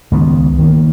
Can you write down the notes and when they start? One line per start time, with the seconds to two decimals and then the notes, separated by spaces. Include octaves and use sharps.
0.12 C#2 D#3 B3
0.59 D#3 A#3